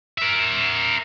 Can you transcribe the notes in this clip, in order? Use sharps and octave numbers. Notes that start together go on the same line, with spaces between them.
A#4 E5